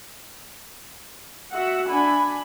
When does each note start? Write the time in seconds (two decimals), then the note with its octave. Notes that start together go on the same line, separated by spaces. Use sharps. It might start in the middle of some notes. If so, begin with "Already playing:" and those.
1.52 F#4 E5 F#5
1.88 D4 G#5 B5